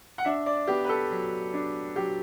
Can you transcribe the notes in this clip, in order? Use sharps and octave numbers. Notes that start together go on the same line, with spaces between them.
F#5
D4 E5
D5
B3 G4
B4
A4
F#3
D4
F#3 G4